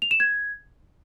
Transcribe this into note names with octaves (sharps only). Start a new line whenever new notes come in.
F7
E7
G#6